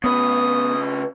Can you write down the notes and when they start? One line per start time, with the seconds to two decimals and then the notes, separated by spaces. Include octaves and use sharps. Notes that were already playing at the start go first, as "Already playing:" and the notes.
0.04 C#3 B3 B4 D#6